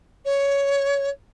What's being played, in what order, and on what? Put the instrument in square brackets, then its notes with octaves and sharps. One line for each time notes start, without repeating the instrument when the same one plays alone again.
[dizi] C#5